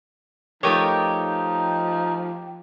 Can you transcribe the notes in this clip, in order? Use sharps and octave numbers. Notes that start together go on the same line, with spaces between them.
F3 A3 D#4 G4 A#4 C#5 G5 D#6